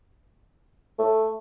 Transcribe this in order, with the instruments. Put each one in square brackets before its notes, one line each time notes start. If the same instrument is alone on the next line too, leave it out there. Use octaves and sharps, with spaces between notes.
[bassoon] A3